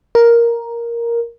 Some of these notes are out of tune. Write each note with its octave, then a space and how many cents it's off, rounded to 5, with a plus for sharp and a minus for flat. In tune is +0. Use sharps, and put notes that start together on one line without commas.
A#4 +5